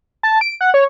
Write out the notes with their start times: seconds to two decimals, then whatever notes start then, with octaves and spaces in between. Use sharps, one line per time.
0.23 A5
0.41 D7
0.61 F#5
0.74 C#5